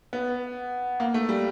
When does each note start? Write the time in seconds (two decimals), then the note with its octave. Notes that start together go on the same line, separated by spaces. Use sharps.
0.13 B3
1.00 A#3
1.14 A3
1.29 G3